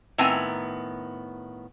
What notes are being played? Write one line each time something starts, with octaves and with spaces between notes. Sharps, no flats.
A2 D#3 B3 C4 G#5 A#5